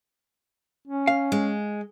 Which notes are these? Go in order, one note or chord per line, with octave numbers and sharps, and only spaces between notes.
C#4
F5
G#3